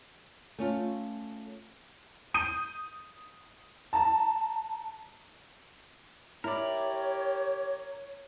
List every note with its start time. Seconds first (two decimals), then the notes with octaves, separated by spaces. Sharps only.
0.59 A3 C#4 F4
2.34 D#6 G6 D#7
3.93 A5 A#5
6.44 E4 G4 A#4 C#5 D5